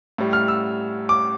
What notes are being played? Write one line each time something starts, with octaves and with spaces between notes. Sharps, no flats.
A2 G3
F6
E6
D6